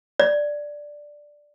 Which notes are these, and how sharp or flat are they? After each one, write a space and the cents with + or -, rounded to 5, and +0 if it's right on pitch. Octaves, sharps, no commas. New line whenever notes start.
D5 +0